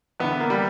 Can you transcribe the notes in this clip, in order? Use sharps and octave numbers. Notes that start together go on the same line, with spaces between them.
E2 D3 B3
A#3
G3